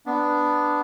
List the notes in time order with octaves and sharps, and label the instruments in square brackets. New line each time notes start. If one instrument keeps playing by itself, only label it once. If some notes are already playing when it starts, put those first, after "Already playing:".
[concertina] B3 D4